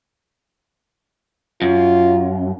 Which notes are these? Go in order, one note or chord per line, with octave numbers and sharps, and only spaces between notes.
F#2 F4